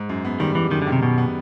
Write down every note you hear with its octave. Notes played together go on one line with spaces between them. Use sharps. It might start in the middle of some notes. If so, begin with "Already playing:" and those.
Already playing: G#2
F#2
B3
D#3 G3
E3 G3
F#2 D#3
D3
D#3
C3
B2 B3
B3